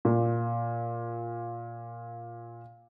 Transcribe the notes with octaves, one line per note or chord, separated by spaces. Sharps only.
A#2 F4